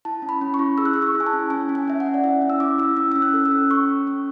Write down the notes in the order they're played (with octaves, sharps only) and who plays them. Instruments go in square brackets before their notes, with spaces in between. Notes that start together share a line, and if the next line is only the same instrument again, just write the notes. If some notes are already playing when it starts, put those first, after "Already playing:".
[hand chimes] E4 A5
C#4
B5
C#4
C#6
E4
G#4 E6
F#6
G#4 E6
C#6
E4
G#5
A5
C#4
C#4 G#5
C#4
G#5
C#4 E5
F#5
C#4
D5
E4 E5
C#4
E6
E4 D6
E4 E6
C#4 E6
C#4 E6
F#6
A4
E6
C#4
C#4 C#6
C#4
C#4